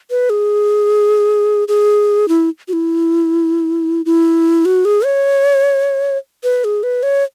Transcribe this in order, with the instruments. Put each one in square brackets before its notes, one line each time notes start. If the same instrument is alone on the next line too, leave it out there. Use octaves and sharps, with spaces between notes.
[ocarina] B4
G#4
G#4
E4
F#4
E4
E4
F#4
G#4
C#5
B4
G#4
B4
C#5